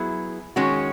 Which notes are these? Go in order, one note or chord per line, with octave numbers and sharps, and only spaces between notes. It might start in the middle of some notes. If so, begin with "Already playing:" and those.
Already playing: F#3 B3 E4 G#4
D#3 G#3 C#4 F#4